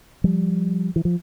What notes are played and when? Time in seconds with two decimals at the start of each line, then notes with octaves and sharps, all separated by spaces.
0.24 F3 G3
0.96 E3
1.05 F3